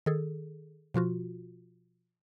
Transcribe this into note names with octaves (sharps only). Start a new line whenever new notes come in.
D#3 G#4 A4
B2 F3 F4 F#4